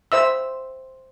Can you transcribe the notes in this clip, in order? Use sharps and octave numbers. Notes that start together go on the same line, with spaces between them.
C5 E5 E6